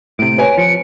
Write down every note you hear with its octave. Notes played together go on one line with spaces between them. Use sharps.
A2 C3 D7
B4 C#5 G#5
F3 C#7